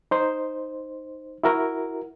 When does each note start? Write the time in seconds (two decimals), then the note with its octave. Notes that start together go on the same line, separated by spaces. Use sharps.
0.11 D#4 C5
1.44 E4 F#4 A#4